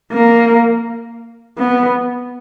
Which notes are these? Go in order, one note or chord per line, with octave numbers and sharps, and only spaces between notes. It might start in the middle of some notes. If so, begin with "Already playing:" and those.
A#3
B3